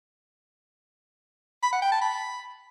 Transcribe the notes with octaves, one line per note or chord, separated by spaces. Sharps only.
B5
F#5
G5
A5
B5